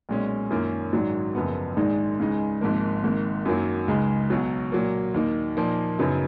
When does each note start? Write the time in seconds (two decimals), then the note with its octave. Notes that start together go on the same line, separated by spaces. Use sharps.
0.09 B1 A#2 G#3 C#4
0.50 F#2 D#3 A#3 C#4 F4
0.93 A#1 G#2 D#3 F#3
1.35 F#1 F#2 F3 B3
1.77 A#1 G#2 D#3 G#3 D#4
2.19 C#2 C#3 G#3 D#4
2.61 G#1 G#2 F3 A#3
3.04 G#1 G#2 D#3 A#3
3.45 F#2 D#3 F#3 A#3
3.88 C#2 C#3 G#3 D#4
4.30 B1 B2 F#3
4.72 A#2 F#3 A#3
5.14 D#2 D#3 A#3 D#4
5.57 A#2 F3 A#3 D#4
5.99 F#2 C#3 F#3 B3 D#4